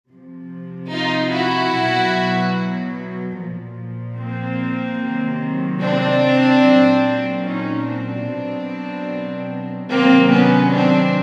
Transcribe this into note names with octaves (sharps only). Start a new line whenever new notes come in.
C3 F3
D#4 F4
E4 F#4
B2 F#3
A#2 F3
A#3 C4
C3 D#3 F#3
C4 D4
A#2 F#3
C#4 D#4
C4 D4
B2 F#3
C3 D#3 F#3 A#3 C4
B3 C#4
C4 D4